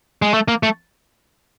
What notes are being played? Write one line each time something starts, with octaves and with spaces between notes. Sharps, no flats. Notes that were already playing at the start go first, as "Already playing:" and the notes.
G#3
A3
A#3
A3